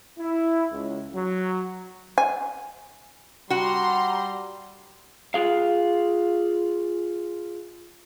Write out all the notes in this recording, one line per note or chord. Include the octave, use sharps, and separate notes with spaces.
E4
C#2
F#3
G#5
G3 F#4 F#5 A#5 C6
F4 G#4 F5